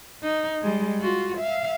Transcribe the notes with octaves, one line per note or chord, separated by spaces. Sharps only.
D#4
G3 G#3
F4 F#4
E5 F5